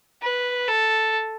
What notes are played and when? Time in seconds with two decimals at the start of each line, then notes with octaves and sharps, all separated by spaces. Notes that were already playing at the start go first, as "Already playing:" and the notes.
0.22 B4
0.68 A4